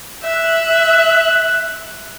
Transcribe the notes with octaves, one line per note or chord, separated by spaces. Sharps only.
E5 F#6